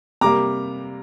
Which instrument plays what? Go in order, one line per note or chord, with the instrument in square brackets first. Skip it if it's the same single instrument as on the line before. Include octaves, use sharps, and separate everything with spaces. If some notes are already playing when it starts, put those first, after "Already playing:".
[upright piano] C3 G3 A#3 A#5 D6